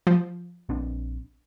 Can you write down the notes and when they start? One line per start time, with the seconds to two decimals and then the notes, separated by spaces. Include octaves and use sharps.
0.07 F3
0.69 A#1 C4 D4